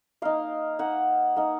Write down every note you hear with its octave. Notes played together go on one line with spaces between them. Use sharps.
A#3 D#4 F5
A#3 D#4 F#5
A#3 D#4